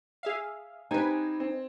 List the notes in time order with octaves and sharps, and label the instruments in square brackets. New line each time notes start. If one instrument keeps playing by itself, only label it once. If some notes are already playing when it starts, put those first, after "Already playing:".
[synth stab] G#4 E5 F5
[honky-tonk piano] C4 G4 G#6 [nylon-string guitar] D#4 [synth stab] B4 G#5
[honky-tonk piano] C4